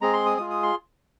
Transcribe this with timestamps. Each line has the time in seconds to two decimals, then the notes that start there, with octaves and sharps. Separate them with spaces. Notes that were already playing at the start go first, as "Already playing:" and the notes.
0.01 G#3 C4 G#4 A#5
0.13 C6
0.26 D#6
0.38 G#3 F4 G#4 D#6
0.50 D#6
0.62 C6